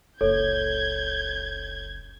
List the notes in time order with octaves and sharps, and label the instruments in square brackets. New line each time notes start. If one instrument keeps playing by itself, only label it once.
[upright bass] F#1 C#2 [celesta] A4 C#5 [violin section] G6 G#6